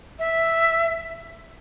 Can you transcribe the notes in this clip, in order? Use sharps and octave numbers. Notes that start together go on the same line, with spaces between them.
E5